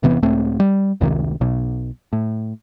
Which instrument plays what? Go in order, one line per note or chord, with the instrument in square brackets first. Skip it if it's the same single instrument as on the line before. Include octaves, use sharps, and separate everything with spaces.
[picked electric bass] E1 C3 E3 B3
C#2 A2 A3 C4
G3
F1 C#2 C3 D#3
B1 B2
A2